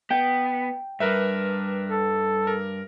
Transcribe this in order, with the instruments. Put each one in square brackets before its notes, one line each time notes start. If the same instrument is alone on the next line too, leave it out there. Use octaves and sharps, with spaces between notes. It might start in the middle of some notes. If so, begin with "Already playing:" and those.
[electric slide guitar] B3 [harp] G5
[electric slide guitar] G2 G3 [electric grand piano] A#4 B4 E5
[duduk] A4
[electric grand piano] A#4